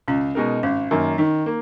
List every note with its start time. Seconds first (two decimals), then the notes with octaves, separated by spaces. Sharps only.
0.08 C#2 C#4
0.35 B2 G#3 D#4 A#4
0.63 G#1 C#4
0.91 F#2 D#3 A#3
1.18 D#3 D#4
1.46 A#3